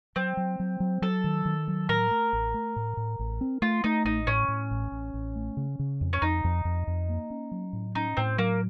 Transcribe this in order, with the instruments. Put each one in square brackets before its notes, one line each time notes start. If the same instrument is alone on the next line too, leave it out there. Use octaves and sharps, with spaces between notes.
[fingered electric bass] F#3 [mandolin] C4
[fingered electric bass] F#3
F#3
F#3
[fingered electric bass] F#3 [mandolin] A4
[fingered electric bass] D#3
D#3
F#3
[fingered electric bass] A2 [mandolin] A#4
[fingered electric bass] A3
A1
A3
A2
A2
A1
C4
[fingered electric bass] A3 [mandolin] F4
[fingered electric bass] A3 [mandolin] D#4
[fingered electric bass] A1 [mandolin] D#4
[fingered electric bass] A2 [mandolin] C#4
[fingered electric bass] A2
A1
A1
A1
A3
C#3
C#3
F2
[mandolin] C#4
[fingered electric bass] F2 [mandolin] D#4
[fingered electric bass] F2
F2
F2
A#3
C#4
F#3
A2
[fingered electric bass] C#4 [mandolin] D#4
[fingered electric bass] A2 [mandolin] C4
[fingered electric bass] F#3 [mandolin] A#3